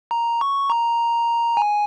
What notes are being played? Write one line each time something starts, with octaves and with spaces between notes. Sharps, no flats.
A#5
C#6
A#5
G#5